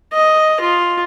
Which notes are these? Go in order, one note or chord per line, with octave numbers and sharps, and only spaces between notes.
D#5
F4